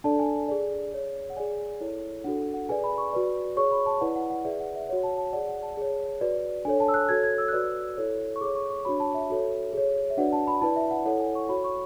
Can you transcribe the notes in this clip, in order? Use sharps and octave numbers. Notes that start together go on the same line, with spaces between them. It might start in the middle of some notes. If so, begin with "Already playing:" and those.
D4 A4 D5 A5
G#5
G#4 D5
G#4 C#5
F#5
G#4 D5 G#5
E4 A4 C#5
D4 F#4 A4 F#5
F#5
G#4 B4 D5 G#5
B5
C#6
F#4 B4 D5
G#4 C#5 C#6
B5
A5
E4 B4 D5 F#5
F#5
F#5
G#4 B4 D5 E5
F#5
E5
F#4 C#5 F#5
A5
A5
G#4 D5 F#5
F#5
A5
G#4 C#5
F#4 B4 D5
D4 A4 C#5 G#5
A5
E6
F#6
F#4 A4 C#5 G#6
G#6
E6
F#6
F#4 B4 D5 E6
E4 A4 C#5
C#6
G#4 C#5 D6
C#6
C#6
D4 F#4 C#5 B5
A5
E5
F#4 A4 C#5
G#4 C#5
E5
D4 F#4 B4 D5 F#5
A5
B5
E4 B4 D5 A5
E5
F#5
E4 A4 C#5 F#5
G#5
C#6
F#4 C#5 B5
C#6